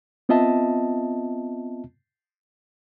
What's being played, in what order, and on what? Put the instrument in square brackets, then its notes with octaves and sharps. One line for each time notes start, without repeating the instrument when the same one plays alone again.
[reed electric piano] B3 C4 F4 D#5 E5 A5